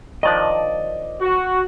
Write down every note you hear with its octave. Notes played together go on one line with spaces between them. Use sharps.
D#3 F3 D4 D5 D#5
F#4